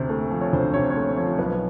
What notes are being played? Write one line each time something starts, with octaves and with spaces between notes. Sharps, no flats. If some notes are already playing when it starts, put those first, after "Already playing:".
Already playing: D2 C3 C5
A3
F3
C#5
D2 C5
C3 C#5
C#5
A3 C5
F3 C#5
B1 B4